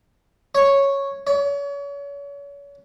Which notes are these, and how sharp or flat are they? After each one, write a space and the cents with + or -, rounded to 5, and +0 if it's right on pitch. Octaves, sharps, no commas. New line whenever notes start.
C#5 -5
C#5 +35